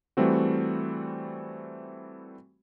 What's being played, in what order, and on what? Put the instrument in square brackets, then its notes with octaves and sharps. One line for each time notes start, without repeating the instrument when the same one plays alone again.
[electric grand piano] E3 G3 A3 C4 F#4